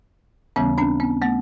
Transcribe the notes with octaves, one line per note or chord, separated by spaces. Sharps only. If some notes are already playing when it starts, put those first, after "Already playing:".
D#2 C#3 E3 G3 B3 C#4
C4 D4
B3 C#4
A3 B3